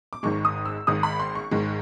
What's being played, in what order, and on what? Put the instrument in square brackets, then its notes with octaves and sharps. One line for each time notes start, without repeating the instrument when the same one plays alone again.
[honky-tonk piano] D6
G#1 G#2 D#3 G#3 C#6
D#6
E6
G#1 G#2 D#3 G#3 D#6
B5
C6
C#6
G#1 G#2 D#3 G#3